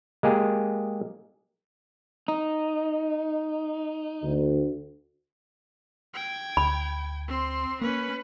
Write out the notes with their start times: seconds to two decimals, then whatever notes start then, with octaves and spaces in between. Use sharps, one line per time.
0.23 G#3 A#3 G4 G#4
2.28 D#4
4.23 D2
6.14 G5 G#6
6.57 D2 B5
7.28 C4 C6
7.82 A#3 C#4 B4